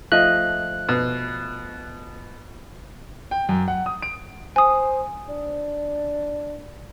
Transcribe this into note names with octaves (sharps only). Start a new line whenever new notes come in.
F3 A3 D#5 F#6
B2
G5
F#2
F#5
D#6
D7
C5 G#5 D#6
D4